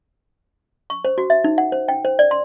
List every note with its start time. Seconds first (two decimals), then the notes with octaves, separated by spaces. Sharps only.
0.90 C#6
1.05 C5
1.18 F#4
1.30 E5
1.44 D#4
1.58 F#5
1.72 C5
1.88 G5
2.05 C5
2.19 D5
2.31 C6